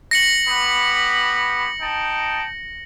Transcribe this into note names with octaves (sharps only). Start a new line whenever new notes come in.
A#6 C#7 F#7
B3 G4 B5
D#4 G5 A5